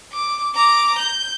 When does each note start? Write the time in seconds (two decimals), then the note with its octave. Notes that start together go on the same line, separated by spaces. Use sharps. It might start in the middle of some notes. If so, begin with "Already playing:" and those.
0.13 D6
0.55 A#5 D6
0.98 G6